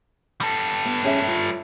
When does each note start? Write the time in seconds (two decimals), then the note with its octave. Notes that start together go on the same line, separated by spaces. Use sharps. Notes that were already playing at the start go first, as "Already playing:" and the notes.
0.41 G3 A4
0.85 B3
1.04 C#4 G#4 E5
1.28 F4